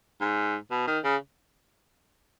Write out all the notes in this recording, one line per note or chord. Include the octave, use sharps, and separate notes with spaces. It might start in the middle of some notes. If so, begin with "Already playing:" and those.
G#2
B2
D#3
C#3